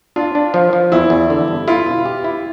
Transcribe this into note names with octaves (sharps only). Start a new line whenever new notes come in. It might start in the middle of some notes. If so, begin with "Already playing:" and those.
D4 F4
D4
F3
F3
E2 E4
E2
D3
G2
E4 F4
B2
G4
E4